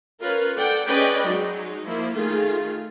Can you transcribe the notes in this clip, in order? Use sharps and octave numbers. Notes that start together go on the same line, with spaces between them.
C#4 F4 A#4 B4 C#5
A4 D5 F#5 G5
C#4 G#4 B4 D5 D#5 G5
F#3 G#3 D#4
F3 A#3 E4
D#3 A3 F4 G#4